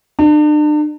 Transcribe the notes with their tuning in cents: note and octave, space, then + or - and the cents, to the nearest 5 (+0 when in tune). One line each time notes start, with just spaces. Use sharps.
D4 +40